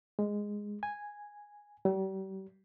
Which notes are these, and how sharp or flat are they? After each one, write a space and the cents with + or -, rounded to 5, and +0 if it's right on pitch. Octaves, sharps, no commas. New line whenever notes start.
G#3 -5
G#5 -5
G3 -40